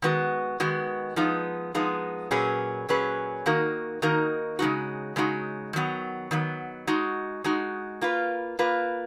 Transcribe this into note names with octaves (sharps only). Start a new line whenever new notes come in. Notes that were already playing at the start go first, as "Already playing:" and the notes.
D#3 G#3 B3 F#4
D#3 G#3 B3 F#4
F3 G#3 B3 D#4
F3 G#3 B3 D#4
A#2 F#3 C#4 G#4 B4
A#2 F#3 C#4 G#4 B4
D#3 A#3 D#4 F#4 A#4
D#3 A#3 D#4 F#4 A#4
C#3 G#3 D#4 F#4
C#3 G#3 D#4 F#4
D#3 F#3 B3
D#3 F#3 B3
G#3 D#4 F#4
G#3 D#4 F#4
A#3 F4 B4
A#3 F4 B4